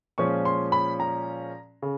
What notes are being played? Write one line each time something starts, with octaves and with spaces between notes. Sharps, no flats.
A#2 F3 G#3 C#4 C#6
C6
B5
A#5
C#3